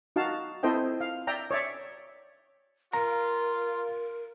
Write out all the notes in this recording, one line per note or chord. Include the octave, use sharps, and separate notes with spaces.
D#4 F#4 F5 A5
C4 E4 A4 C5 D#5 G5
F5
D5 E5 G5 A#5
C#5 D5 E5
F4 A#4 A#5